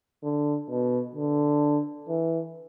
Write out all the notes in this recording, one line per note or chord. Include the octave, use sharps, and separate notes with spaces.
D3
B2
D3
E3